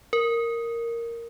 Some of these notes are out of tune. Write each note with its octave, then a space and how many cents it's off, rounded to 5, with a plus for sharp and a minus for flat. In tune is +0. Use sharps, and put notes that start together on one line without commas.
A#4 -5